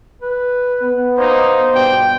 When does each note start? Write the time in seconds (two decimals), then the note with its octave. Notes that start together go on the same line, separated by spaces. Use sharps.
0.21 B4
0.82 B3
1.17 A#3 D#4 C5
1.73 A#1 G2 B2 D5 G5